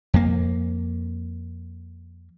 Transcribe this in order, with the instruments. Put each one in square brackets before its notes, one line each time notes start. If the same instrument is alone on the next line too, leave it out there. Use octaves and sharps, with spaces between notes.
[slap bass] F2 A#3